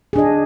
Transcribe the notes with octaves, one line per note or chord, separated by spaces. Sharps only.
D4 G#4 D#5